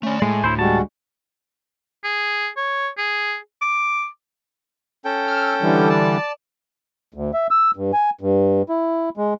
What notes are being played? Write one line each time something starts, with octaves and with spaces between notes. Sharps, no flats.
A3 C#4 D5
A2 G#3 A3 G#5
D2 E4 C5
G3 G#3 F#4 A5
G#4
C#5
G#4
D6
C#4 A4 G5
E6 F6
D3 E3 G3
D5 A5
D2
E5
E6
G2
G#5
G2
E4
G#3